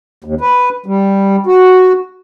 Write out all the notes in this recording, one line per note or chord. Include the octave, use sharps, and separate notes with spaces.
D#2
B4
G3
F#4